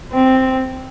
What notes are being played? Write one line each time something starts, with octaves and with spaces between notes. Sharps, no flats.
C4